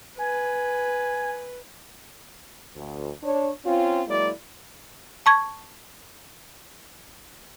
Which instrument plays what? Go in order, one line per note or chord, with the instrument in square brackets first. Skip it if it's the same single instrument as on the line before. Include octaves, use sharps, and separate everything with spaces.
[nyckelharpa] B4 [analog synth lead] G#5
[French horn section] D2
D4 C#5
C4 C#4 F4
F#3 G#3 A#3 E4 D5
[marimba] A5 C#6 G#6